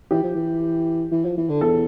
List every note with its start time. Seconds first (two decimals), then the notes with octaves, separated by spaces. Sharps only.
0.11 E3 G4
0.23 F3
0.35 E3
1.11 E3
1.25 F3
1.37 E3
1.49 D3
1.61 E2 A4